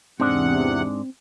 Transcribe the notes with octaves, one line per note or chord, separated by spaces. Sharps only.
E2 G#2 C3 G#3 C4 D4 F#5